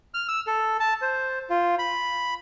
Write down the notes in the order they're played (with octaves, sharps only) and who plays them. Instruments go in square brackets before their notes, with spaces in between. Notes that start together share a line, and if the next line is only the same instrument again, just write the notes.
[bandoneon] F6
E6
A4
A5
C5
F4
B5